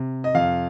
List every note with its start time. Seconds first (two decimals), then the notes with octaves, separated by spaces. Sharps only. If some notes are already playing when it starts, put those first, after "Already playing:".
Already playing: C3
0.24 D#5
0.34 F2 F5